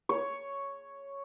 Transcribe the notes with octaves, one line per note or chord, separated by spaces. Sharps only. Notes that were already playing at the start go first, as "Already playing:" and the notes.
C#5